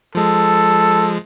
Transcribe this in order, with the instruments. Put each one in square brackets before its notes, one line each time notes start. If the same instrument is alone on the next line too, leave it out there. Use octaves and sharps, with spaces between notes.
[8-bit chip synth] F3 G#3 [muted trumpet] A4